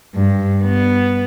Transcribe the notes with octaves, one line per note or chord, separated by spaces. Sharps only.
G2
B3